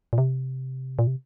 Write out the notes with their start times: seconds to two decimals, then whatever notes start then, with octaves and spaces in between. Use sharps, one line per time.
0.13 A#2
0.18 C3
0.99 A#2
1.07 C3